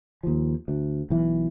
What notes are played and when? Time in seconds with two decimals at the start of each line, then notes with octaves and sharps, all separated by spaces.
0.23 D#2 F3
0.68 D2
1.10 B1 E3